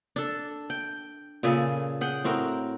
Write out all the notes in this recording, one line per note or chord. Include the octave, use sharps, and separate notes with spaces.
D4 A4
G5
A#2 C#3 G#4 A4
G#4 F#5 G5
A2 C4 F#4 A#4